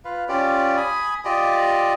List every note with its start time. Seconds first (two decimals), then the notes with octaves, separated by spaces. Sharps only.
0.05 F4 B4 F5
0.29 C#4 F4 G4 D5
0.77 G#5 B5 D#6
1.25 F4 G4 D5 D#5